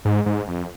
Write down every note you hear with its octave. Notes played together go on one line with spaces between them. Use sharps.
G#2
G#2
F2